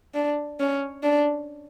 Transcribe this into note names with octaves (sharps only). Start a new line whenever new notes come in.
D4
C#4
D4